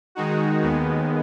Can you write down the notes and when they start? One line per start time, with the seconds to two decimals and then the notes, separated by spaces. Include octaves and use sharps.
0.15 D#3 G#3 D#4 F#4
0.62 D#2 D#3 G#3 B3